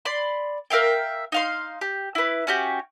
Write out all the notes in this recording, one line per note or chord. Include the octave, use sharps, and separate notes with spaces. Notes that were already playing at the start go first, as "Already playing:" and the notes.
D5 B5 C6
A#4 E5 F5 G5
D#4 F5 C6
G4
E4 B4
C#4 F#4 G4